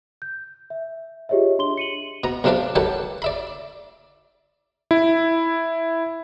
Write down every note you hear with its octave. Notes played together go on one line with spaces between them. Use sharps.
G6
E5
F4 G4 G#4 C#5 D#5 E5
D4 C6 G7
C#7 D#7 F#7
B2 A#5
B1 C3 D4 F4 B4 D5
D#3 F#3 G4 A4 B4
D5 E5 B5
E4